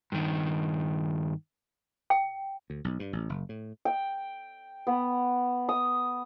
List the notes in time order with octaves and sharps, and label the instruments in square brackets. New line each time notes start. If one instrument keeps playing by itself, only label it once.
[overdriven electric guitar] G2 D#3
[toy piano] G5
[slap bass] D2
B1
G2
A1
F#1
A2
[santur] G5
B3
D#6